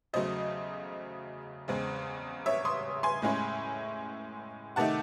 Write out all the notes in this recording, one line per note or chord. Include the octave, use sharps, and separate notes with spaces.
E2 C#3 F#3 A3 C5 D#5
E2 C#3 G#3 C4
C#5 E5
C6 D#6
G#5 C6
A2 G#3 C#4 E4
C3 D#3 A3 D#4 F#5 A5